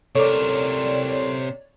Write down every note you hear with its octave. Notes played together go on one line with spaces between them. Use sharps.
C3 A4 A#4 C#5 D5